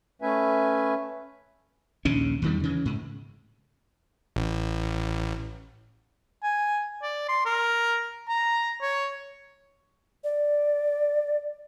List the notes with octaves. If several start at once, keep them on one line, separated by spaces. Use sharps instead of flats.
A3 C#4 B4 E5 G#5
A#1 D#2 C#3 C#4
E2 D#3 G3
C#3 E3
G#2
A1
G#5
D5
C6
A#4
A#5
C#5
D5